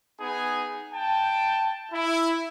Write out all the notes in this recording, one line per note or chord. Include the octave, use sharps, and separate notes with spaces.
B3 D#4 G#4 G#5
G5 A5
E4